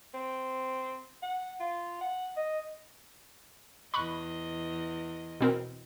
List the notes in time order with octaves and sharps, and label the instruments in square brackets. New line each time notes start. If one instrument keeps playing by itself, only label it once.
[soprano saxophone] C4
F#5
F4
F#5
D#5
[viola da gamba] E2 D#5 [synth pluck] B5 C#6 F#6
[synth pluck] B2 C4 A#4